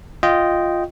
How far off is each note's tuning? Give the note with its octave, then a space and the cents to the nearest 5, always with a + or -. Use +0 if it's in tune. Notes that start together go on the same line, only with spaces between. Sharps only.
F4 +0 D#5 +0 G5 -10